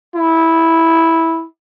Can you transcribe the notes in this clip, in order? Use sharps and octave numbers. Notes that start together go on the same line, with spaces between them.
E4